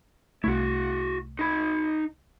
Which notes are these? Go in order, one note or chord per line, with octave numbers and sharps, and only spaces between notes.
C2 A3 E4 F#4
D#4 B5